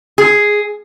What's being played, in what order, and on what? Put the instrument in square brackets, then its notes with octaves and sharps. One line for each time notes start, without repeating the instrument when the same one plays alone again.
[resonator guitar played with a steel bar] G#4